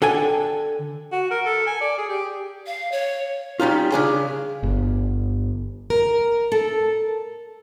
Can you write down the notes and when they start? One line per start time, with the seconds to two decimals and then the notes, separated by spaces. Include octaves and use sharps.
0.02 D3 A4 G5 G#5
1.12 F#4
1.31 A#4
1.45 A4
1.66 G#5
1.81 D5
1.98 G#4
2.09 G4
2.66 F5
2.92 C#5
3.60 G3 C#4 D#4 F4
3.92 C#3 D4 G#4
4.63 G1
5.90 A#4
6.52 A4